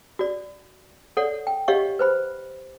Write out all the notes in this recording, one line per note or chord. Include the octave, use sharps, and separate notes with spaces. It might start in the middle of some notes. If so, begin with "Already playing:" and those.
F#4 D5
A4 C#5 D5 F#5
G5
G4 C#5 D#5 F5 F#5 C#6
B4 C5 B5